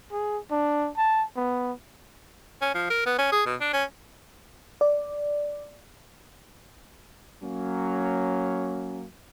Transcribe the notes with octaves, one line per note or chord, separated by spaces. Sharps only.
G#4
D4
A5
B3
C#4
F3
A#4
B3
C#4
G#4
B2
D4
C#4
D5
F#3 A#3 C#4